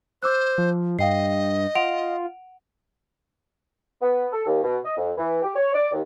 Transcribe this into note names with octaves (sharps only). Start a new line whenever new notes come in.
C5 D6 E6 F#6
F3
G2 D#5 F5 G5 C7
F4 F#5 D7 F7
B3
A4
D#2
B2
D#5
F2
E3
G4
C#5
D5
D#2